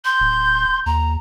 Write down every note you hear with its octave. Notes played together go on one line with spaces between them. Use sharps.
C6 G6
D1
D#2 A#5